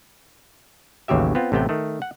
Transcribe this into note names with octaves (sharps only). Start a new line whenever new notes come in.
A1 D#2 C#3 F#3 G4 E5
B3 C4 F4
A1 C3 A3 B3 G5
D#3 A3
F#5